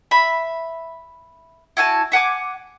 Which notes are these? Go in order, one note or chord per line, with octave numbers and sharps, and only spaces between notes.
E5 B5
E4 F#4 G#5 A5
E5 F#5 G#5 D6